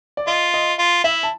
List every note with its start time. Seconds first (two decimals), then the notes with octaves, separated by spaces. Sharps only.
0.17 D5
0.27 F4 D#5
0.54 D#5
0.79 F4
1.04 E4 E5
1.23 A5